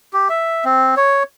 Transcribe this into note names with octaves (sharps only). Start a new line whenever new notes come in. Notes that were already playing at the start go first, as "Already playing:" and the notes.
G4
E5
C4
C#5